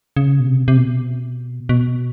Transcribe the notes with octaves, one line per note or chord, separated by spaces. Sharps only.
C#3
B2
C3
C3
B2
B2